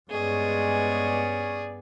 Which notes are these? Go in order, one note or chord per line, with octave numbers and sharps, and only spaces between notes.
G2 G#3 B3 C#4 G#4 C#5 D5